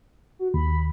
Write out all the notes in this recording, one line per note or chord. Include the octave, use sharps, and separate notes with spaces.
F#4
D#2 B5